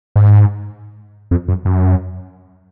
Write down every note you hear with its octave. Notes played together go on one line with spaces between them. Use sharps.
G#2
F2
F#2
F#2